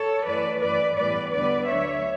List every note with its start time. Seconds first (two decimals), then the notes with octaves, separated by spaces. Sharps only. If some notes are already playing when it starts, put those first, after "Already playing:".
Already playing: A4 C#5
0.26 F#2 E3 A3 B4 D5
0.61 F#2 E3 A3 B4 D5
0.97 A2 E3 G3 B3 B4 D5
1.32 E2 D3 G3 B3 B4 D5
1.67 D2 D3 F#3 A3 C#5 E5